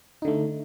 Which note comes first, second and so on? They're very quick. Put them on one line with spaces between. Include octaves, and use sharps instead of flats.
D#4 D3 A3